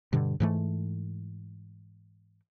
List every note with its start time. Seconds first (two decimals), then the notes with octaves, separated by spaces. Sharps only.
0.13 G2 B2 D3
0.40 G#2 E3 A3